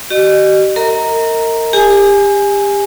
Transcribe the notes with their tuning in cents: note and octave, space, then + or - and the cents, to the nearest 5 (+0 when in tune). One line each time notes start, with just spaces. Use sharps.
G4 -40 D#5 -35
A#4 -30 D#5 +35 A#5 +0
G4 +30 G#5 +0